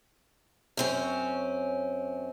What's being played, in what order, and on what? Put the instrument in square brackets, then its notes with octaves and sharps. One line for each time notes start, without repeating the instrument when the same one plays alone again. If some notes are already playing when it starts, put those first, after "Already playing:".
[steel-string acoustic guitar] F#2 C4 C#4